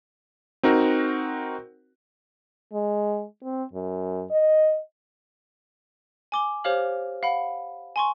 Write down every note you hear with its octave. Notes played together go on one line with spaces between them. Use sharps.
C4 D#4 F#4 A#4
G#3
C4
F#2
D#5
G#5 D6 G7
G4 C5 C#5 F5 F6 F#7
F5 F#5 B5
G#5 C6 C#6